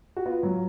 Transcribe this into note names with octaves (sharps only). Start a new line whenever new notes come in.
F#4
B3 F4
F#3